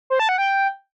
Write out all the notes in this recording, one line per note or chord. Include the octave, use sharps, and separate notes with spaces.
C5
A5
F#5
G5